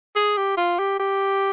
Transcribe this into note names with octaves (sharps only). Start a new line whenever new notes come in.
G#4
G4
F4
G4
G4